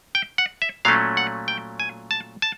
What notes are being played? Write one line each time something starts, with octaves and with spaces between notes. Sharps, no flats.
G5
F#5
E5
A#2 F#3 A3 C#4 F5
F#5
G5
G#5
A5
A5